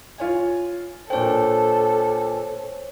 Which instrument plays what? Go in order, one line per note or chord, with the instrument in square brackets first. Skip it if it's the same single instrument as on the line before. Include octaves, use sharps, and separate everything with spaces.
[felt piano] F4 C#5 G#5
[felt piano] A#2 D4 G5 [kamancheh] A4 [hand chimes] C5 C#5